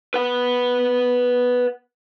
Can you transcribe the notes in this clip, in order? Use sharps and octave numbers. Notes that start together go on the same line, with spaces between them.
B4 F#5